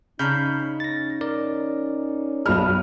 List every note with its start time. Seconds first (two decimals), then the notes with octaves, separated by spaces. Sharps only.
0.19 C#3 C#4 D#4 A#5 B5 G6
0.80 A6 A#6
1.21 A#4 D5
2.46 B1 G#3 D#5 B5 F6